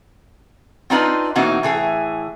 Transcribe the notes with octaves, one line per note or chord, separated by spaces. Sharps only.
C4 D4 D#4 F4 B4 D#5
B2 E3 A#3 C4 D#4 F#4
A2 E3 G#4